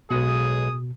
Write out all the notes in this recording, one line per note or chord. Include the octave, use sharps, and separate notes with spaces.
B1 B2 G#3 G#4 F#5 D#6